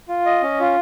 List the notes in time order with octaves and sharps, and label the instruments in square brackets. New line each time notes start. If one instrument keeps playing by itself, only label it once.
[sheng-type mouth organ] F4
D#5
C#4
F4